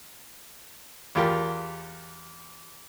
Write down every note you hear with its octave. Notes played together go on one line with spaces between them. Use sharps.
E2 F4 G4 A#4